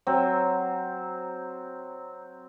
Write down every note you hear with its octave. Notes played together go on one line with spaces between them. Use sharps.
F#3 C4